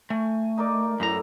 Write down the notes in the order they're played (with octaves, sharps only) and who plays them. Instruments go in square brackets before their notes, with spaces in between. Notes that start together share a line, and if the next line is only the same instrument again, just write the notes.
[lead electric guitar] A3 [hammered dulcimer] G#5
[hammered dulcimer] D#4 A#4 D5
[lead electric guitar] F#2 A#5 [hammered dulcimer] A2 E4